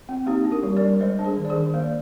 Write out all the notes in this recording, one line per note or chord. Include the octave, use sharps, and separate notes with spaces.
C4
A#3 D#4 G4
D4
G4 A#4
G3
A#4 D5
G3
G#3 C5 D#5
D4
G#4 C5
D#3
D5
G#4 C5
D#3
A#3 C5
D5